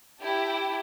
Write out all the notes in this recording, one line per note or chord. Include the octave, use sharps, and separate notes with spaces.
E4 G4 G5 A5